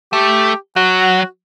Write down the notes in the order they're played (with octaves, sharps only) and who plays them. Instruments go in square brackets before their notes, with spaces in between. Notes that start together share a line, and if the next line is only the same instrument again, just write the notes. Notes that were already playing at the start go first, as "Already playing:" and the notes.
[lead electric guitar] A3 [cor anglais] G4
[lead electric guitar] F#3 [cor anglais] F#4